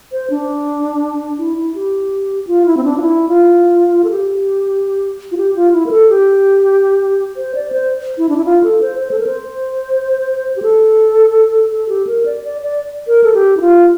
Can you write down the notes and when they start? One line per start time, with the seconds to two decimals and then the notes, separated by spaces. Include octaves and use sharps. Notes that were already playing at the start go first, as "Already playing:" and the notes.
0.12 C5
0.30 D4
1.39 E4
1.57 E4
1.75 G4
2.47 F4
2.66 E4
2.77 C4
2.84 D4
2.98 F4
3.02 E4
3.29 F4
4.04 A4
4.10 G4
5.32 F4
5.37 G4
5.55 F4
5.73 E4
5.86 A#4
5.91 A4
6.09 G4
7.36 C5
7.55 D5
7.72 C5
8.18 E4
8.29 D4
8.37 E4
8.45 F4
8.63 A4
8.82 C5
8.99 C5
9.11 A4
9.19 A#4
9.27 C5
10.56 G4
10.62 A4
11.71 A4
11.89 G4
12.07 A#4
12.26 D5
12.44 D5
12.62 D5
13.07 A#4
13.24 A4
13.34 G4
13.57 E4
13.61 F4